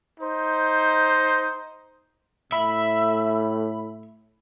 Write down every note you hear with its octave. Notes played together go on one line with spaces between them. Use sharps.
D#4 C5
A2 E5 B5